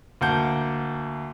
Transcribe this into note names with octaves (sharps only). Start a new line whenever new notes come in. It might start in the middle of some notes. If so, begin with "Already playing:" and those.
D2 A#3 F#5 A5 G6